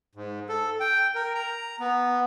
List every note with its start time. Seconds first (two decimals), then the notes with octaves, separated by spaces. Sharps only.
0.15 G#2
0.49 A4
0.80 G5
1.15 A#4
1.35 A#5
1.79 B3